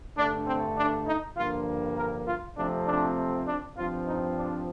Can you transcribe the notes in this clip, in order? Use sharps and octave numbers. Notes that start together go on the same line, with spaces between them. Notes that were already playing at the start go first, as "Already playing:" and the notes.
G2 D3 A3 D4
C4
D4
D#4
G2 D3 F3 A#3 F4
A#4
F4
F2 C3 F3 A3 C4 D4
D4
D4
G2 F3 C4 F4
D#4
D4